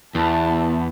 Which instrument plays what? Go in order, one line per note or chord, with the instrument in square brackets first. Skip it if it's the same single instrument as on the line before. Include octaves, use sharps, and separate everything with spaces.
[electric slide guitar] E2 [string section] B3 A5 [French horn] E4